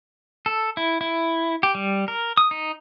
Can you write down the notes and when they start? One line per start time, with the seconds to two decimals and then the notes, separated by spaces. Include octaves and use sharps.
0.46 A4
0.77 E4
1.01 E4
1.63 G4
1.75 G3
2.08 A#4
2.37 D#6
2.51 D#4